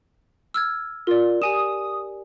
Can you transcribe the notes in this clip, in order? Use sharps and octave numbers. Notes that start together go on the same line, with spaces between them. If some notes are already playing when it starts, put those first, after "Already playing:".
E6 F6 G#6
F4 A#4 D5
G4 G#5 D#6 E7